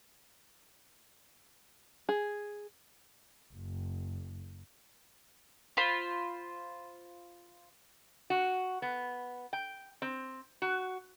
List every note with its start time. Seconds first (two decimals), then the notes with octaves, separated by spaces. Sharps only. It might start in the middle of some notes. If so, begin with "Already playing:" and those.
2.09 G#4
3.53 F#1
5.77 F4 C5 B5
8.30 F#4
8.82 B3
9.53 G5
10.02 C4
10.62 F#4